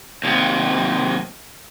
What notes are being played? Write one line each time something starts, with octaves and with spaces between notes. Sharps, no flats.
D#2 C3